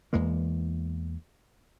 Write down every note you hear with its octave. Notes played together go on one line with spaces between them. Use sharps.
E2 E3 G#3 A#3